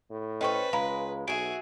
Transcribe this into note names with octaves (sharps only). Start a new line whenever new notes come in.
A2
C#4 A4 B4 C5 D#5 G5 C#6
C#2 G#3 F5 A#5 B5
B1 F#4 G#4 E5 D7